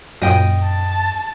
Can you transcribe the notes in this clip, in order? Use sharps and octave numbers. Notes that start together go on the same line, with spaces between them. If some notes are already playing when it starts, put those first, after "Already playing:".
F#2 A#2 F#3 A#3 D#5 G5 D#6
A5